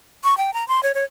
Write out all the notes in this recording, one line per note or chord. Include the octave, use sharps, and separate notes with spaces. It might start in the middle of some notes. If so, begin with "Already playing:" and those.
C#6
G5
A#5
C6
C#5
C#5